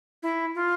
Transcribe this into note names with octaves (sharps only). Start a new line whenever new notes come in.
E4
F4